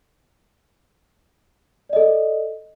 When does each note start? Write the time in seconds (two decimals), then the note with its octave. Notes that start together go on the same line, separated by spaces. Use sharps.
1.89 D5
1.93 D#5
1.96 A4